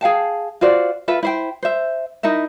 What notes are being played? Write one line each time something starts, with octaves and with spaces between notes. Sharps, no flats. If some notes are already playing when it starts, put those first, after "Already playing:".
G#4 F5 G5 A5
F4 F#4 C5 D5
F4 A4 B4 E5
E4 C5 G5
C5 E5
D#4 E4 A#4 E5